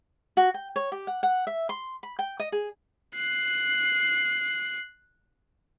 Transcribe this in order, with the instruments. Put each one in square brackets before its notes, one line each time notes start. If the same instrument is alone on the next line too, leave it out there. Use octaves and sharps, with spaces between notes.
[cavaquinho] F#4
G5
C#5
G4
F#5
F#5
E5
C6
B5
G5
D#5
G#4
[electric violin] F#6 C7